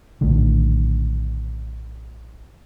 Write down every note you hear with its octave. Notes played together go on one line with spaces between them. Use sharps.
A#1 A2 D3 D#3